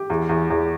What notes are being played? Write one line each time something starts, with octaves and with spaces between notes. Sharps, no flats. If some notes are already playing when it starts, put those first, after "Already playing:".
Already playing: G4
E2
E2
E2